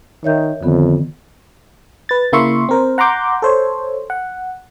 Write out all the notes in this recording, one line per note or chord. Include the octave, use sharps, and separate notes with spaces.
D#3 C#5 E5 G6
F2 D3 D#3 B3
B4 A6
C#3 A#3 E4 E5 C6 C#6
C4 A#4 C5
F#5 A#5 C6 D6 G6
A4 C5 C#5
F#5